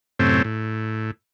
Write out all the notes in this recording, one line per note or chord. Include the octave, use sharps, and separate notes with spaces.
F#2 A2 C3 A3 C4 C#4
A2